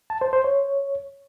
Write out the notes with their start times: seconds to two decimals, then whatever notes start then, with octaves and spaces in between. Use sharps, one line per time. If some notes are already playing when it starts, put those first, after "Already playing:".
0.10 A5
0.21 C5
0.33 C5
0.44 C#5